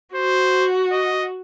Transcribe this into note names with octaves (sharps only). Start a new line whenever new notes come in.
F#4 C5
D#5